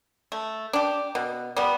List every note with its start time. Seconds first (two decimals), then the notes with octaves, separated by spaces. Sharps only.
0.32 A3
0.73 D4 G4
1.15 B2
1.56 G3 B3